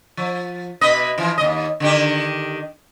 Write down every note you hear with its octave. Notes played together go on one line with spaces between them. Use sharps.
F3
B2 B4 D#5
E3 F3
D#2 D#5
D3 D#3 G4